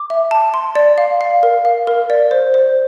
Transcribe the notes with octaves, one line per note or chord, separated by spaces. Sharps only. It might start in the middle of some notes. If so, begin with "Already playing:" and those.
Already playing: D6
E5
A5
C6
D5
F5
F5
A#4
F5
A#4
D5
C5
C5